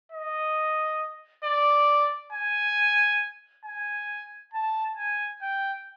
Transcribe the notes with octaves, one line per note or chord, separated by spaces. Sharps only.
D#5
D5
G#5
G#5
A5
G#5
G5